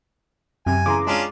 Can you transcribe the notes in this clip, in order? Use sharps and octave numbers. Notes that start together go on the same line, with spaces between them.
F#2 C3 G#5
C#3 E3 A#5 C6 D6
G#3 C#4 D4 F4